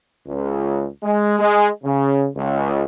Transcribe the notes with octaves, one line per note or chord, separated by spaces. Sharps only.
C#2
G#3
G#3
C#3
C#2